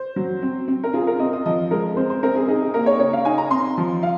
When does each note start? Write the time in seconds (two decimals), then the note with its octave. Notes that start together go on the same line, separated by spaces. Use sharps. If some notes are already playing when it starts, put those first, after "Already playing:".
Already playing: C5
0.16 F#3
0.42 C4
0.68 C4
0.84 A#4
0.93 F4 G#4
1.07 A#4
1.19 C4 D#5
1.33 D#5
1.46 F3 D#5
1.71 G#3 A#4
1.96 C4 C5
2.10 C5
2.23 C4 A#4
2.35 G#4
2.48 D#4 G#4
2.61 G#4
2.74 A#3 A#4
2.86 C#5
2.99 C#3 C#5
3.13 F5
3.25 D#4 G#5
3.38 A#5
3.51 C4 C6
3.77 F3
4.03 F5